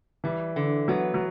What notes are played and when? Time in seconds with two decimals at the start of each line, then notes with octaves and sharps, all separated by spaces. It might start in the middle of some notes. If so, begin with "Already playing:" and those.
0.24 E3 G3
0.56 D3
0.88 F#3 B3
1.14 F#3